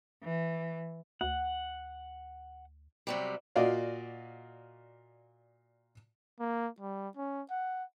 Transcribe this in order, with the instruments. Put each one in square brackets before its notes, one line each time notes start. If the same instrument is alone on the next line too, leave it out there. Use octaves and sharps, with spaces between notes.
[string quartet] E3
[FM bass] D2 [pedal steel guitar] F#5
[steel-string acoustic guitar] C3 F#3 G3
[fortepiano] A#2 F#4 D5 D#5 F5
[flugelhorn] A#3
G3
C#4
F#5